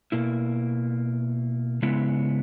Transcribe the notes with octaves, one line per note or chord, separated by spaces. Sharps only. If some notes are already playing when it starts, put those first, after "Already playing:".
B2 A#3 E4
C#3 G#3 B3 E4